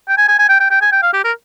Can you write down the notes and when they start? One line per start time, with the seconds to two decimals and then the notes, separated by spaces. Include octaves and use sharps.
0.09 G5
0.18 G#5
0.28 G#5
0.39 G#5
0.49 G5
0.60 G5
0.71 G5
0.82 G#5
0.92 G5
1.03 F5
1.14 G4
1.24 A#4